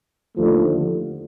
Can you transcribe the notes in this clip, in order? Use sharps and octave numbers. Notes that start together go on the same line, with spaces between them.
D#2 D3 F3 A3